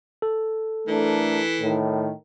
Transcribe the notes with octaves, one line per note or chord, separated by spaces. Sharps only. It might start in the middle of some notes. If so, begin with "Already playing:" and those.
A4
E3 A3 D4 A#4
A2 D#3